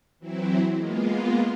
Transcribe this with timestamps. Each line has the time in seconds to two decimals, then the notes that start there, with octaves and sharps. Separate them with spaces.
0.19 E3 F#3 C4 E4
0.74 G#3 A#3 B3 F4